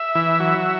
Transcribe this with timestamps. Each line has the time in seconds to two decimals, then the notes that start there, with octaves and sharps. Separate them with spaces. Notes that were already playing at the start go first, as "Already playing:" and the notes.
Already playing: E5
0.15 E3
0.40 F#3